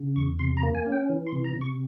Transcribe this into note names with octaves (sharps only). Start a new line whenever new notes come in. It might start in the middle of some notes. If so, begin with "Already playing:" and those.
Already playing: C#3
E2 C#6
C3 C6
A#5
A#3
G#5
C#4
G5
E3
C6
C3
A#5
C3
C#6